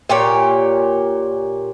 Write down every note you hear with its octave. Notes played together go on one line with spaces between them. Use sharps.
A#2 G4 C#5